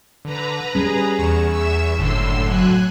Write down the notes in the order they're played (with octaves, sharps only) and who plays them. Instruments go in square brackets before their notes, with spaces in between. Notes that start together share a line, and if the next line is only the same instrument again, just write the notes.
[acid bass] D3 [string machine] B4 A#5
[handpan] G3 C#4 [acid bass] G#4
[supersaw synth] E2 C#6 E7
[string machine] E5 E6
[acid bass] F#1 [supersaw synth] A2 D3 [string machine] C6 E6
[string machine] F#3 G#5 F#6